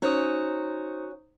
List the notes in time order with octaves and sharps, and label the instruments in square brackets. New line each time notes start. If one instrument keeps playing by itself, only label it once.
[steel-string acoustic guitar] C#4 F#4 C#5 [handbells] D#4 C5 D#6